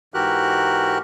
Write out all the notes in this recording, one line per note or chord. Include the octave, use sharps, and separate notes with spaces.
G#2 E3 F#4 G4 A#4 F#6